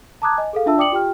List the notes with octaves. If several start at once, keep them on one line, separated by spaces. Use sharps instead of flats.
A5 A#5 D6 D#6 F#6 G#6
D#5 G#5
G#4 A4 F5
D4 F4 E5 A5 E6
D5 G5 D6 D#6 C#7 F#7
F4 G4 G5 F6